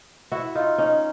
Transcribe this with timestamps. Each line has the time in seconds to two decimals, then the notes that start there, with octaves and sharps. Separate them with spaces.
0.32 E4 F#4
0.55 D#4 F4
0.78 C#4 D#4